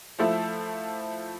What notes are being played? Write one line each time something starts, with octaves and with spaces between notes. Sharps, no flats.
F3 A3 E4 A4